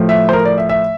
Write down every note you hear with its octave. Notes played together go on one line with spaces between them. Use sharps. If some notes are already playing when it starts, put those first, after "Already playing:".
Already playing: A2 F3 A3
E5
C5
A#4
D5
E5
E5